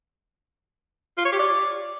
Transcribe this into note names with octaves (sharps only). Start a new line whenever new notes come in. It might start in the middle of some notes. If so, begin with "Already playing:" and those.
F4
C#5
G4
D5